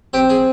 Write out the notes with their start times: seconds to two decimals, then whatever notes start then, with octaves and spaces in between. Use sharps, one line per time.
0.13 C4 G4
0.30 G#4